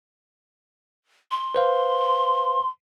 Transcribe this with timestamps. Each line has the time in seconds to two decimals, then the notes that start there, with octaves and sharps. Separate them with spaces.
1.31 C6
1.55 B4 C5 F5